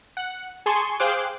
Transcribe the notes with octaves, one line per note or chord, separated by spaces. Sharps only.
F#5
G#4 G#5 A5 C6 C#6
G#4 C5 F5 G5 D6 F#6